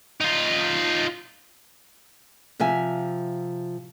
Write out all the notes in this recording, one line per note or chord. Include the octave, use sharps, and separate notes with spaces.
D#4 F4
C3 F3 E5 G#5